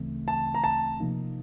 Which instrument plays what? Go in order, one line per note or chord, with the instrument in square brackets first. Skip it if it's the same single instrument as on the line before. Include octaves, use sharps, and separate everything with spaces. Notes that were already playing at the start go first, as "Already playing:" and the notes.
Already playing: [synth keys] D2 C#3 E3 A3 C4
[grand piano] A5
A#5
A5
[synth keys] C3 F3 A#3 D#4